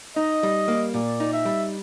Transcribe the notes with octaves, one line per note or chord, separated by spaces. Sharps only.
D#4 D#5
G3
A#3
A#2 D5
D#4
E5
G3